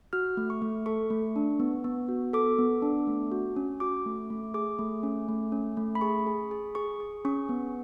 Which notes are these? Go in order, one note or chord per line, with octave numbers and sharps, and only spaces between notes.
F#4 F6
A3
C#6
A3
A4 C#6
A3
D4
B3
B3
F#4
A4 D6
B3
D4
A3
F#4
C#4
F#4 D6
A3
A3
G#4 D6
A3
C#4
A3
C#4
A3
B5
G#4 C#6
G#4
G#4
G#4 C#6
G#4
C#4 C#6
B3